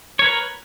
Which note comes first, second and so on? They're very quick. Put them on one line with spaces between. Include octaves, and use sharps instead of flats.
C#5 A#4 B4